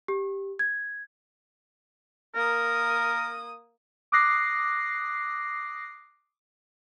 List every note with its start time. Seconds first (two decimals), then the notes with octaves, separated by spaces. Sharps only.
0.08 G4
0.59 G#6
2.35 A#3 A#4 D#6
4.12 D6 D#6 F#6 A#6 C7